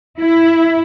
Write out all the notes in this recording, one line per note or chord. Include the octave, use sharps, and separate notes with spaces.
E4